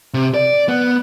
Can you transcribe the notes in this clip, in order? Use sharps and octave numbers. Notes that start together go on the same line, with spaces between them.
C3
D5
B3